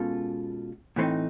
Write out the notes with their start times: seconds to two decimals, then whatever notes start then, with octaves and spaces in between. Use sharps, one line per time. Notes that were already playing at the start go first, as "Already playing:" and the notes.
Already playing: B2 G#3 C#4 F4 A4
0.96 A2 E3 A3 C4 D#4